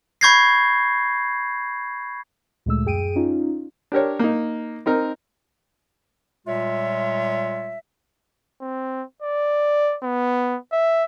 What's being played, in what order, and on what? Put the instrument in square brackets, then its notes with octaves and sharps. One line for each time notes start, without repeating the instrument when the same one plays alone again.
[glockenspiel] B5 C#6 G6 G#6 A#6 C7
[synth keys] D2 A#2 G#3 A3 E6
F#2 G#4 G5 D7 D#7
C#4 D#4 F4
[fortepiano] D4 G4 A#4 C#5
A#3 D#4
C4 D#4 A#4
[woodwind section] A#2 G3 G#3 F4 C#5 E5
[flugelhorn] C4
D5
B3
E5